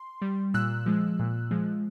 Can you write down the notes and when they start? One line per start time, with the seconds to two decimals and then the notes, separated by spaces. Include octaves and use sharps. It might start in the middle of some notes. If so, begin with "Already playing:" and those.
Already playing: C6
0.22 G3
0.54 A#2 E6 F#6
0.86 F3 G#3
1.19 A#2
1.51 F3 G#3